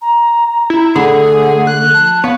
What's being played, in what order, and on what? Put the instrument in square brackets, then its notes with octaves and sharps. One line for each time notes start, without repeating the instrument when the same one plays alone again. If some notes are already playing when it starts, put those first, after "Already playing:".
[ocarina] A#5
[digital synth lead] E4
[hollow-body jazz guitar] D3 B5 [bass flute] A3 [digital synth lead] G#4 [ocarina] F#5
[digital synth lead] F#6
[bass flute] F3 [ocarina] A5
[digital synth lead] B3 [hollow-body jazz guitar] C#5 [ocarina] F5